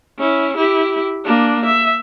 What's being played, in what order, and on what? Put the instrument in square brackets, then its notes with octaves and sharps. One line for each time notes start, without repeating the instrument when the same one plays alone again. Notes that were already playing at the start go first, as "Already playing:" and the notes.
[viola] C#4 E4
E4 G4
A#3 D4
E5